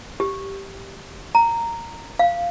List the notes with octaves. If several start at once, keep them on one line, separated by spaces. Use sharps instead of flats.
G4
A#5
F5